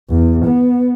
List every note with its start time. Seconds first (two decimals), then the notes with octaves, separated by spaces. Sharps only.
0.11 E2
0.45 B3